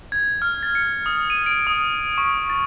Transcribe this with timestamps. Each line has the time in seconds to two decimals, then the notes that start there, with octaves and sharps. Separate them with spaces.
0.12 G#6
0.42 F6
0.63 A6
0.75 C#7
1.06 D#6
1.30 D#7
1.46 D7
1.67 D#6
2.18 C#6
2.50 A6